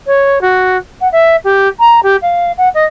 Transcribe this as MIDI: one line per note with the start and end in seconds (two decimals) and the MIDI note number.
0.06 0.41 73
0.41 0.77 66
1.01 1.08 78
1.12 1.36 76
1.44 1.68 67
1.80 2.00 82
2.03 2.16 67
2.22 2.52 77
2.58 2.69 78
2.74 2.85 75